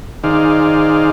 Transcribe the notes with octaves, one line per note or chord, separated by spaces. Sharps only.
D#3 D#4 G#4 C5 D5 F5